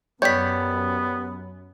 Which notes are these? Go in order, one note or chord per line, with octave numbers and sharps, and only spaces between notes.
F#2 G3 B3 G4 C#5 G6 B6